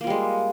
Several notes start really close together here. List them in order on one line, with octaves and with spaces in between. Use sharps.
A#3 F4 G3 G#3